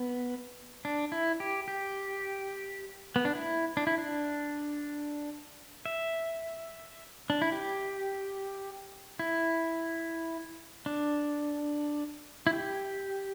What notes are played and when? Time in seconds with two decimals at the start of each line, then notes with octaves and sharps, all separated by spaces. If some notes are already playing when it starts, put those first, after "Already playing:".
Already playing: B3
0.85 D4
1.12 E4
1.40 G4
1.68 G4
3.16 B3
3.25 D4
3.35 E4
3.77 D4
3.87 E4
3.98 D4
5.86 E5
7.30 D4
7.42 E4
7.52 G4
9.19 E4
10.86 D4
12.47 E4
12.53 G4